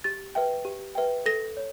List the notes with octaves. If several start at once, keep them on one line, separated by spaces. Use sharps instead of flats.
G4 A6
B4 E5 G5
G4
B4 E5 G5
A4 A#6
C#5